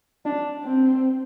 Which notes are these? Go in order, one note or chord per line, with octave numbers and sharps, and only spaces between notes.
D4
C4